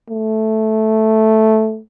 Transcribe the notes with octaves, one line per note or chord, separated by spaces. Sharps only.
A3